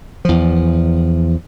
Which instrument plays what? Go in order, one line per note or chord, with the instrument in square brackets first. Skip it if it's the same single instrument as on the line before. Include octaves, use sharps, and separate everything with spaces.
[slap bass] E2 F3